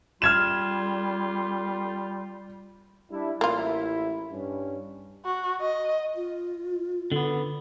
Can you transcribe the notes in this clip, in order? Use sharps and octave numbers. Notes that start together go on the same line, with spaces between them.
G3 F4 F6 G#6 E7
G3 D4 E4
A1 A#3 E4 F4
G2 C#4
F#4
D#5
F4
D3 B3